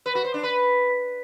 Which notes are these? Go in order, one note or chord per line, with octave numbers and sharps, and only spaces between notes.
B4
F#4
C5
D4
B4